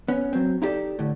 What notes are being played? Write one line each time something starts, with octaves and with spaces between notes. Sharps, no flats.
B3 C#4
F#3 C4
D#4 E4 G4 A4 D5
A2 D3